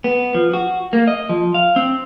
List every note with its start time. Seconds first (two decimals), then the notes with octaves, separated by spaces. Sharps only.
0.04 B3
0.35 F3
0.54 F#4
0.93 A#3
1.07 D#5
1.29 F3
1.54 F5
1.76 C4